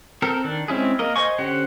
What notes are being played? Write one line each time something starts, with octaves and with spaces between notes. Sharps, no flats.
C4 A4 A#4
D#3 D4
G#3 C4 C#4 E4 G#4
A#3 A#4 D#5
C5 D#5 G#5 C#6
D3 C#4 G4 C5 F#5